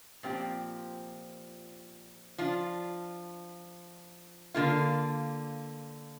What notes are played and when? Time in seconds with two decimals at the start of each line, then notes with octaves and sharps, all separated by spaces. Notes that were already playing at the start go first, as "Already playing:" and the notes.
0.23 A#2 F3 C4 G4
2.38 F3 D4 F4
4.54 D3 A#3 F4